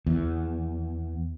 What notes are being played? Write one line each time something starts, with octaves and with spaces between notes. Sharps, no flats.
E2